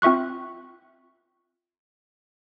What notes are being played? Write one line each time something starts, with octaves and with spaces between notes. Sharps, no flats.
C4 F4 E5 C#6 F#6